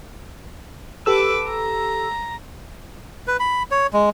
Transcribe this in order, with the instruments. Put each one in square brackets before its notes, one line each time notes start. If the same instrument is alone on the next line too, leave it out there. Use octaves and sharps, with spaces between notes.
[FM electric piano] G4 A4 E6 [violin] B4 D6
[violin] A#5
[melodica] B4
B5
C#5
G#3